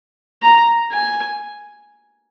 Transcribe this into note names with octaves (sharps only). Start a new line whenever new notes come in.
A#5
G#5